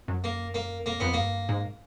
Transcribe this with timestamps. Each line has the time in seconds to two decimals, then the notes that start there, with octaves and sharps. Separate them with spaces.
0.08 F#2
0.24 A#3
0.54 A#3
0.81 E2
0.86 F2 A#3
1.00 F2 B3
1.13 G2 A#3
1.49 G#2